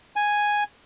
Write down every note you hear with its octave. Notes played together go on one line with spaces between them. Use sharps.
G#5